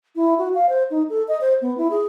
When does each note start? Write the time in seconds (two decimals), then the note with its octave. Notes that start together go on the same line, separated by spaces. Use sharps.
0.16 E4
0.38 F#4
0.54 F5
0.69 C5
0.91 D#4
1.10 A4
1.28 D#5
1.41 C5
1.62 B3
1.78 E4
1.91 G#4